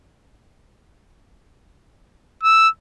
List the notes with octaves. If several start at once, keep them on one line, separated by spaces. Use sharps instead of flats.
E6